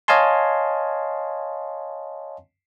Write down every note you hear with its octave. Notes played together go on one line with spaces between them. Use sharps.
C#5 D#5 F5 G#5 A5 C6